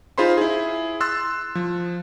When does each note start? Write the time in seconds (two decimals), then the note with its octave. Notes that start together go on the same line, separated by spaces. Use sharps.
0.18 D#4 F4 G#4 C5 B5 C6
0.37 E4 G#4
1.01 C6 E6 F#6 A6
1.55 F3